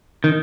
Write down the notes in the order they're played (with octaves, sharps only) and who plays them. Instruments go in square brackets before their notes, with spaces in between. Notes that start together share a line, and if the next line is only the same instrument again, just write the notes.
[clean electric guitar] D#3